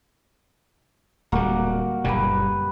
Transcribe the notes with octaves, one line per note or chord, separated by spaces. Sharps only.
D1 G3 A#3 F#4
F#1 A#2 G3 G4 B4